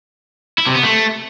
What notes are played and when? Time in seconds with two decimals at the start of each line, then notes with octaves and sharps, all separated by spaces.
0.58 E4
0.67 C3
0.75 B3
0.83 A3